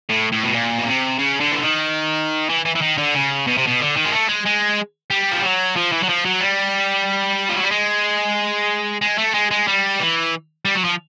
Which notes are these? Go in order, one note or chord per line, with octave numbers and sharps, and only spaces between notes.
A2
A2
B2
A#2
B2
C3
C#3
D3
E3
D#3
E3
E3
E3
D#3
D3
C#3
B2
C3
B2
D3
D#3
G#3
A3
G#3
G#3
G3
F3
F#3
F3
E3
F#3
F3
F#3
G3
F3
F#3
G3
G#3
G#3
A3
G#3
G#3
G3
E3
G3
F#3
F3